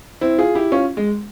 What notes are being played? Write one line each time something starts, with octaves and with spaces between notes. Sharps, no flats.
C4 E4
F4 G#4
E4 G4
C#4 F4
G#3